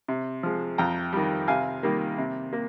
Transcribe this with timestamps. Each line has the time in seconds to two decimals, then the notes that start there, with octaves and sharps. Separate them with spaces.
0.08 C3
0.43 F3 G#3
0.78 F2 G5 A#5
1.13 D#3 G3
1.48 C3 F5 G#5
1.83 D#3 G3 A#3
2.18 C3
2.53 A#3